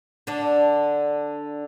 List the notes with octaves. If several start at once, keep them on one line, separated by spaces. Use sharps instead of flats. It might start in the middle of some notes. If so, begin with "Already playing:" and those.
D3 D4